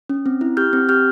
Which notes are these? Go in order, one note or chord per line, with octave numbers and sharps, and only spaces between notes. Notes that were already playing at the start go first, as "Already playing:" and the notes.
C#4
C4
E4
G4 F6 G6
C4
G4 F6 G6